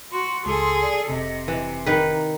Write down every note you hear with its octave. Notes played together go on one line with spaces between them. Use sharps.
F#4 C6
C#2 G#4 A4
D5
F1 C3 D#5
E3
D#3 D#4 B4